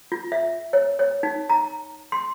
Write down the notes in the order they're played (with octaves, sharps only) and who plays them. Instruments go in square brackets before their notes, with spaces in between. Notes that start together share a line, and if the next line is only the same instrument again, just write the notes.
[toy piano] F4
E5
C#5
C#5
D#4
A#5
C6